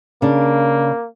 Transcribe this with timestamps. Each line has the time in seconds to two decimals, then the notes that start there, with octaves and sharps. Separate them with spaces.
0.22 C#3 A#3 D4